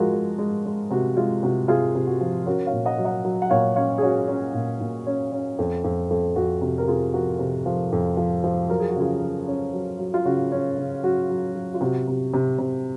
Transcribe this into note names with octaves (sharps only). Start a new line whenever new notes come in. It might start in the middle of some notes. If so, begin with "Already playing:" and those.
Already playing: F3 G#3 F4 F#4 G#4 A#4
G#3
G#3
G#3
C3 F#4
G#3 F4
C3 F#4
C3 F4 G#4
C3
F#4
F3
C#4 F#4 A#4
C#5 F5
A#2
D#5 F#5
F#3
D#5 F#5
F#3
F#5
A#2 C#5 F5
C#4 C#5 F5
G#4
C#4 F#4
C#4
A#2
A#2
C#4
C#4
F2
F2
F2
F2 F#4
C3 F#4
A#4
C3 F4 G#4
F3 F#4 A#4
C3
F3
F2
F3
F3
F#3 A#4
G#4
F#4
C#3 F4 G#4
F#3
C#4
F#3
F#3
F4
C#3 F#4
C#4
C#3
F#3 F#4
F#3
F#3
F4
C3 F#4
C3
C3
C3